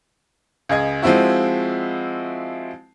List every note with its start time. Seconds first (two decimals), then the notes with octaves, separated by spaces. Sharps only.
0.69 C#2 G#4 D#5 G#6
1.02 F3 G#3 C4 E4 F#4